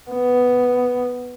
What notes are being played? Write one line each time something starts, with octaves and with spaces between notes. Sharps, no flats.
B3